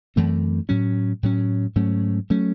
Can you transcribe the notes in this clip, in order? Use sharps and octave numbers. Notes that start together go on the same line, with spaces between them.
F#2 E3 A3 C4
A2 F#3 C#4
A2 F#3 C#4
G#2 F#3 A3 C#4
F#3 A3 C#4